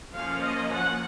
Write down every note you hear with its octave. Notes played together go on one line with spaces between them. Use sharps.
F3 A#3 C#4 F5
D#5
F#5